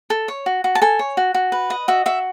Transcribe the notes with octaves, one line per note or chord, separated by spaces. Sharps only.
A4
C#5
F#4
F#4
A5
A4 G#5
C#5
F#4
F#4
B4
D#5
F#4 E5
F#4 E5